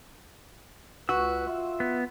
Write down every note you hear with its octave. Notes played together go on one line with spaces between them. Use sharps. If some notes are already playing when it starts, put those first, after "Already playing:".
C#2 F#4 B4 E6
F4 E5
B3